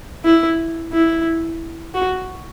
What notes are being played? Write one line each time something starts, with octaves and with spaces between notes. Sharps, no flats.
E4
E4
F#4